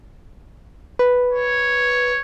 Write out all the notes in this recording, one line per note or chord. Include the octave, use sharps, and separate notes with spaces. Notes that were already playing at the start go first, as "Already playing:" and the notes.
B4
C#5